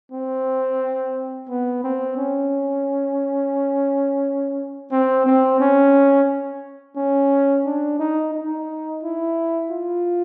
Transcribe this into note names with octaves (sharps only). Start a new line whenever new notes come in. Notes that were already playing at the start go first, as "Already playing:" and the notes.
C4
B3
C4
C#4
C4
C4
C#4
C#4
D4
D#4
D#4
E4
F4